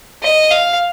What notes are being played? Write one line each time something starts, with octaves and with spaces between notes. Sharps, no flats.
D#5
F5